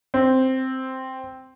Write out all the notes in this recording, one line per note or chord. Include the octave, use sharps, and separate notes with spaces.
C4